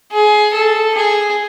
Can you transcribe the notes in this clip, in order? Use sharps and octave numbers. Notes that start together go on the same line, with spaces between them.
G#4
A4
G#4